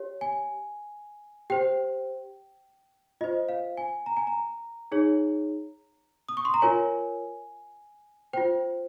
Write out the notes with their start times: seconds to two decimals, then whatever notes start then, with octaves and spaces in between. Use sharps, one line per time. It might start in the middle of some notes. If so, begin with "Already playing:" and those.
Already playing: G4 C#5
0.21 G#5
1.50 G4 C5 G5
3.21 F4 C5 D#5
3.49 F5
3.77 G#5
4.06 A#5
4.17 G#5
4.27 A#5
4.92 D#4 G#4 C#5
6.29 D#6
6.37 C#6
6.45 C6
6.54 A#5
6.62 F4 A#4 C#5 G#5
8.33 F4 C5 G5